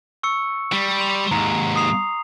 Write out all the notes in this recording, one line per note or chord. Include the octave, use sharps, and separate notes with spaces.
C#6 E6 C#7
G3
C6 F7
D#2 G#2 A#5
D#6 C7 F7